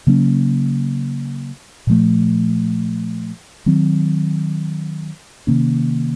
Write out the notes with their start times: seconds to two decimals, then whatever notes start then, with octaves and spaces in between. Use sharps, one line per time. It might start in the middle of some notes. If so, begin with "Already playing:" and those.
0.07 C#3 F#3 A#3 C#4
1.87 A#2 F3 A3
3.66 D#3 F#3 C4
5.47 C3 D#3 A#3 C#4